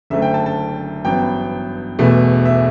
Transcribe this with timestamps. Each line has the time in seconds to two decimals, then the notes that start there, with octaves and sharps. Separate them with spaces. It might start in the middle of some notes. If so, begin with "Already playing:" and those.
0.10 F#1 F#2 D3 A3 E5
0.22 G5
0.34 A5
0.46 A5
1.05 A1 G2 F#3 B3 G5
1.99 E1 E2 B2 A3 E4
2.46 E5